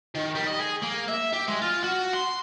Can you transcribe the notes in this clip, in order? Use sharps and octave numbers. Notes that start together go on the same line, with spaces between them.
D#3
G3
D#5
G#4
A#3
E5
G4
G#3
F4
F#4
C6